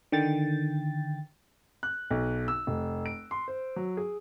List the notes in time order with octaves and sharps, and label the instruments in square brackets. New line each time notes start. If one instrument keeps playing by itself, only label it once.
[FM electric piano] D3 D#3 G5 A6
[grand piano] F#6
B1
E6
F1
D7
C6
C5
F#3
G#4